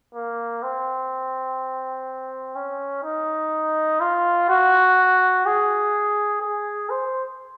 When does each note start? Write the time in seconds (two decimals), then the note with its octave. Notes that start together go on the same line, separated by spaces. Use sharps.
0.15 A#3
0.63 C4
2.56 C#4
3.04 D#4
4.01 F4
4.49 F#4
5.46 G#4
6.42 G#4
6.90 C5